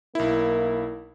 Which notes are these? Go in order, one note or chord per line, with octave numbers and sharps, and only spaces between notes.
B1 A#3 E4